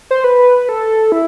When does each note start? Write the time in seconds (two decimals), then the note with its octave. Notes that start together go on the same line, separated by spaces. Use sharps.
0.11 C5
0.24 B4
0.69 A4
1.12 E4